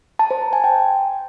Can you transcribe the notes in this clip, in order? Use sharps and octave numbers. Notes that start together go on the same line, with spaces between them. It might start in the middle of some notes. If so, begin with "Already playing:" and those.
A5
C5
A#5
G#5
G5